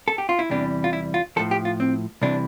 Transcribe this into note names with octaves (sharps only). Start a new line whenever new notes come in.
A4
G4
F4
E4
E2 C3 E3 G3 D4
F4
E4
F4
A2 F3 A4
G4
F4
C4
C2 C3 E3 D4